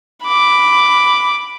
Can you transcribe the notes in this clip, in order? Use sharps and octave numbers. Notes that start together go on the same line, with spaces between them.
B5 D6